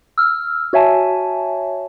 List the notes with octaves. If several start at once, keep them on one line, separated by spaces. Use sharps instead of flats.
E6 F6
F#4 C#5 E5 G#5 A5